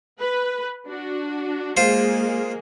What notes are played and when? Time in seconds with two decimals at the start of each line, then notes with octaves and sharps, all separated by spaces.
0.20 B4
0.88 D4 F#4
1.77 G#3 A#3 F4 G#4 C5